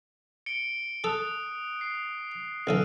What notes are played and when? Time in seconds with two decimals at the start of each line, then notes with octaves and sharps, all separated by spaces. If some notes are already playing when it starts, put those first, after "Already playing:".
0.46 C#7 D7 G7
1.04 A4 D#6 F#6
1.81 C7
2.67 B1 D3 E3 E6 F6 D#7